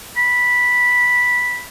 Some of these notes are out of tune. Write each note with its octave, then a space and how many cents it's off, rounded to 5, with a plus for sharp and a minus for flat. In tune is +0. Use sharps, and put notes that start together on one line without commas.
B5 -5